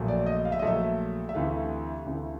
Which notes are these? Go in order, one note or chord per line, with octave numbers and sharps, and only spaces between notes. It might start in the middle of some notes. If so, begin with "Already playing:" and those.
Already playing: A#1 A#2 F#3 A3
D5
D#5
F5
E5
D#5
A#1 A#2 F#3 A3 E5
E5
D2 C3 E3 A3 F5
D2 C3 E3 A3